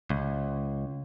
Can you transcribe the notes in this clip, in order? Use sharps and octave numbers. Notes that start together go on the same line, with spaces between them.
C#2